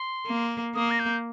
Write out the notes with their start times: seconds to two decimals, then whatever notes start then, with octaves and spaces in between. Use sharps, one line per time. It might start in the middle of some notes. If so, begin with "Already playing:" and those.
Already playing: C6
0.26 A#3
0.75 A#3 D#6
0.91 A#6
0.99 G6